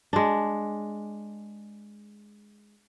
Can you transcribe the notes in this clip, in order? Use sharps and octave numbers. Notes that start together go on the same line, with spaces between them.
G#3 D4